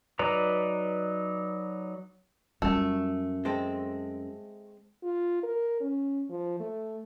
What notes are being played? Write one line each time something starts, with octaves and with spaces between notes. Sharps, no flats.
F#3 D#4 B4 D5 A#5
F#2 G3 A3 F4
G#3 C4 A4
F4
A#4
C#4
F3
A3